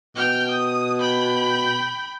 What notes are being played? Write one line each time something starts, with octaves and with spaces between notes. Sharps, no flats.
B2 G5 F6
D#6
G5 B5